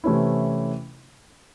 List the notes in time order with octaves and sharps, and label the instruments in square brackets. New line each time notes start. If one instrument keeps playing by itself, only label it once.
[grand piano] C3 E3 A3 C#4 E4